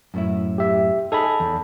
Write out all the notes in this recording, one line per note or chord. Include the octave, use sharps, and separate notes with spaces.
F#2 A2 E4
G4 E5
D#4 G#4 A4 A5 B5
E2